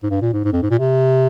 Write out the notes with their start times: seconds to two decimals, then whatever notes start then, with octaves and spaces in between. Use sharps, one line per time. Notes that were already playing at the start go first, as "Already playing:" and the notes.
0.03 G#2
0.10 G2
0.22 A#2
0.33 G#2
0.45 G#2
0.53 F2
0.62 G#2
0.71 A#2
0.79 C3